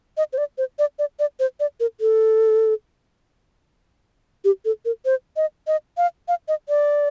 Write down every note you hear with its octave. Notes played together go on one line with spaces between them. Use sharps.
D#5
C5
D5
C5
D5
D5
D5
C5
D5
A#4
A4
G4
A4
A#4
C5
D#5
D#5
F5
F5
D#5
D5